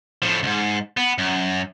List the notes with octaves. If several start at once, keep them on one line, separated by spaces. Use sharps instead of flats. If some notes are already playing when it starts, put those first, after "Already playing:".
A2 F3
C#2 G#2
B3
F#2